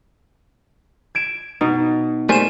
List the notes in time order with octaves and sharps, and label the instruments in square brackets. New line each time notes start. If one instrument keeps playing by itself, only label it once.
[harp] G#6 D7 E7
[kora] B2 [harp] D#4
[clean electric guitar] G3 A3 A#3 [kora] C5 [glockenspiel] G#5 E7